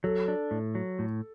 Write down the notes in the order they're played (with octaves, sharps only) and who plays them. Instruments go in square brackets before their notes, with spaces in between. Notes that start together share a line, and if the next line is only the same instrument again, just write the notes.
[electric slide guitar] F#3 [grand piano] A4
[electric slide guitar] D4
A2
F#3
A2